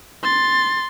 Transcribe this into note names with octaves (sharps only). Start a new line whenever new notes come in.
C6 A6